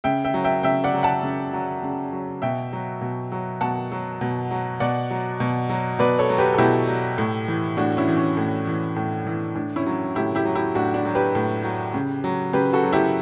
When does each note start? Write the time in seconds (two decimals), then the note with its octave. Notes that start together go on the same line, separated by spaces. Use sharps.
0.04 C#3 E5 G5
0.25 E5 G5
0.34 F#3
0.44 E5 G5
0.63 C#3 E5 G5
0.84 D5 F#5
0.94 F#3
1.03 F#5 A5
1.23 C#3
1.53 F#3
1.83 C#3
2.13 F#3
2.42 B2 E5 G5
2.73 F#3
3.01 B2
3.32 F#3
3.61 B2 F#5 A5
3.92 F#3
4.21 B2
4.51 F#3
4.80 B2 D5 F#5
5.11 F#3
5.40 B2
5.69 F#3
5.99 B2 B4 D5
6.19 A4 C#5
6.29 F#3
6.38 G4 B4
6.54 A4
6.58 B2 E4 G4
6.88 F#3
7.18 A2
7.48 E3
7.77 A2 D4 F#4
7.97 C#4 E4
8.08 E3
8.17 C#4
8.37 A2
8.67 E3
8.96 A2
9.27 E3
9.55 A2 D4
9.76 C#4 E4
9.86 F#3
10.15 A2 E4 G4
10.35 E4 G4
10.45 F#3
10.55 E4 G4
10.75 A2 D4 F#4
10.94 D4
11.05 F#3
11.15 G4 B4
11.35 A2
11.64 F#3
11.94 C#3
12.24 F#3
12.53 C#3 G4 B4
12.73 F#4 A4
12.84 F#3
12.93 E4 G4